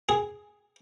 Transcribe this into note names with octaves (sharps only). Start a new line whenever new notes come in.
G#4